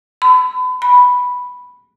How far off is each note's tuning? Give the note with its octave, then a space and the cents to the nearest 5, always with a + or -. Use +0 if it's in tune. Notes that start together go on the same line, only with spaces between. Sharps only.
B5 +35
B5 -5